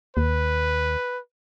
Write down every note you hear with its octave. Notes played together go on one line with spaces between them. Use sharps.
D#2 B4